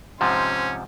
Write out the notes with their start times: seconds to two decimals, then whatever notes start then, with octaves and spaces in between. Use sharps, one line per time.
0.21 G#2 C3 F3 C#4 C5